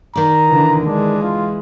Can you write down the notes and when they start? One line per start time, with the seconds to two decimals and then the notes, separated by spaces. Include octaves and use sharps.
0.15 D#3 D5 A#5
0.49 D3 E3
0.86 E3 G#3 D4
1.22 F4